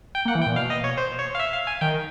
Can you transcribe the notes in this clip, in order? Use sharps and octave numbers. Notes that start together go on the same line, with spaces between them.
G5
A#3
F#5
E3
G5
A#2
B2 F5
D#5
C#5
C5
C#5
F5
E5
F5
G#5
D#3 G5